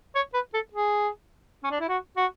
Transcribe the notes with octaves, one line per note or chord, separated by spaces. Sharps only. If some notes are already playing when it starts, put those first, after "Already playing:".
C#5
B4
A4
G#4
C#4
D4
E4
F#4
F#4